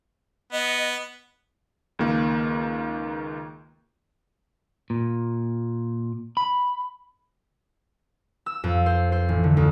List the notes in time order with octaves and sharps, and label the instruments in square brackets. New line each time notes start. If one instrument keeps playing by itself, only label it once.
[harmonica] B3 [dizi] D#5
[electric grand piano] C#2 D#3 A#3
[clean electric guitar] A#2
B5
[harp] E6
F2
C5
C5
A1
D3
D2